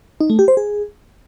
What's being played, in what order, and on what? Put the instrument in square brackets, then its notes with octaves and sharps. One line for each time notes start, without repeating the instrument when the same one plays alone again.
[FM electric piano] D#4
A3
G4
C5
G#4